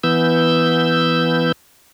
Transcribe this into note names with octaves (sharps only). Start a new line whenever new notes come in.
E3 B3 E6 G6